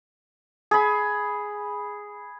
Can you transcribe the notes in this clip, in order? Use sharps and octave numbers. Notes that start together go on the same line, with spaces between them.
G#4 B5